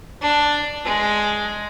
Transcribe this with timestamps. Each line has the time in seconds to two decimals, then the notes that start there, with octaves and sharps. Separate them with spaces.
0.21 D4
0.85 G#3